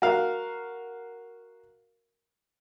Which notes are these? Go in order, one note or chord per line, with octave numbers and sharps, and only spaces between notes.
F#4 A#4 F5